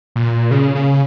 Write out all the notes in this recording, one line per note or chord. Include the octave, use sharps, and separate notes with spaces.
A#2
C#3
C#3